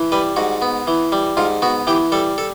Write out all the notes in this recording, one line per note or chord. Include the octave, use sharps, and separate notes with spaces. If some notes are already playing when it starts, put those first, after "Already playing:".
Already playing: E3
G3 B4
G#2 F#4
B3
E3
G3
G#2 F4
B3 F#4
E3 G4
G3 A4
A4